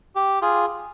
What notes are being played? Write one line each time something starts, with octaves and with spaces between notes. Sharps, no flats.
G4
F4 G#4